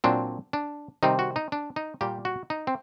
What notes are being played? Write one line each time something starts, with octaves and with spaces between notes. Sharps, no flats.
A#2 F#3 C4 D4
D4
C3 D#3 G3 C4 D#4
F#4
D#4
D4
D#4
A#2 G3 A#3 G4
F#4
D#4
C4